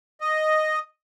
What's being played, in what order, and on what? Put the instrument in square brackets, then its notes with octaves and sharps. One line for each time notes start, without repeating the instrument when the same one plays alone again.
[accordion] D#5